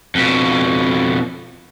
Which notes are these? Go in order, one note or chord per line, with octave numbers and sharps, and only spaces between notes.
F2 B2